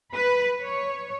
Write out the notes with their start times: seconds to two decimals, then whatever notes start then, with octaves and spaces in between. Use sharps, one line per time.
0.14 B4
0.63 C#5